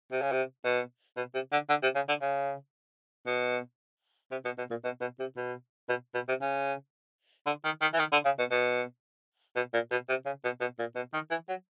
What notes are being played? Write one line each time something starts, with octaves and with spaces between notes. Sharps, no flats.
C3
C#3
C3
B2
B2
C3
D3
D3
C3
C#3
D3
C#3
B2
C3
B2
B2
A#2
B2
B2
C3
B2
B2
B2
C3
C#3
D3
D#3
D#3
E3
D#3
D3
C#3
B2
B2
B2
A#2
B2
C3
C#3
B2
B2
A#2
B2
D#3
E3
F#3